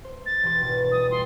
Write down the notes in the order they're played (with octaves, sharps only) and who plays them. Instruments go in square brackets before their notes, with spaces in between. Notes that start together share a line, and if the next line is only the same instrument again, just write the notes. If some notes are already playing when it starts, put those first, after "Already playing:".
[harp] C5
[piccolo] A6
[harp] E1 G4 C6
G#1 B2
[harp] G3 [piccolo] D#6
[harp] F4 A4 G5 [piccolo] C6